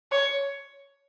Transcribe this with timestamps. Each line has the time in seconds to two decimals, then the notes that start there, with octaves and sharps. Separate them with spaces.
0.11 C#5